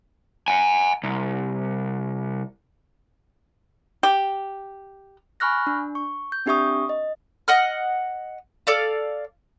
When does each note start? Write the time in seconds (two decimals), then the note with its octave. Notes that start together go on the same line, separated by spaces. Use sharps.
0.48 F#5 G#5
1.04 C2
4.03 G4
5.40 G#5 B5 C#6 F6 F#6 A#6
5.67 D4
5.95 C#6
6.32 G6
6.46 C4 D4 G4 E5 C#6 D#6
6.89 D#5
7.48 D#5 F#5 F6
8.67 A4 D5 F5